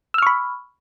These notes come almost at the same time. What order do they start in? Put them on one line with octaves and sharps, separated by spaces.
E6 F6 C#6 B5